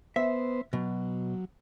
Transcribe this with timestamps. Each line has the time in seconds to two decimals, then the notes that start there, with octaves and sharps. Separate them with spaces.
0.16 B3 C5 E5
0.73 B2 F#3